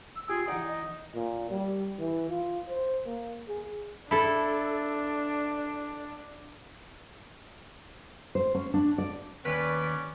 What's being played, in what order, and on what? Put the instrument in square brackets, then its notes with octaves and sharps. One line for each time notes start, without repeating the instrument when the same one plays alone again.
[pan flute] E6
[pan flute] F4 [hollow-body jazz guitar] G4 [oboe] G#4
[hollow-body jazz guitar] E3 D5 [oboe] D#4 [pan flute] F#5
[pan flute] D#5
[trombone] A#2
G3
E3
F4
C5
A#3
G#4
[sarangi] D4 [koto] E4 A4
[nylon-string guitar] C5
C#4
D4
D5
[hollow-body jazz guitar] D#2 [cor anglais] C#4 [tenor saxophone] B4 [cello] D5